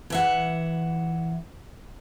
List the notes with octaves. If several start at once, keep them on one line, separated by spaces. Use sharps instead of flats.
E3 E5 F#5